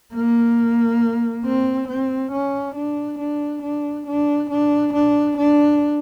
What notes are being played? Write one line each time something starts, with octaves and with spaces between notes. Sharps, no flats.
A#3
C4
C4
C#4
D4
D4
D4
D4
D4
D4
D4